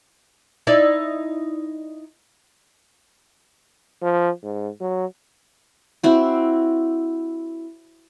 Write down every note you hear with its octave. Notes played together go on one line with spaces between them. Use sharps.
D#4 E4 D5
F3
G#2
F#3
C4 E4 F#4